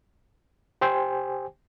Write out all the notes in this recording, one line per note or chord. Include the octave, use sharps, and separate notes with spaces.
G4 C5 G5 G#5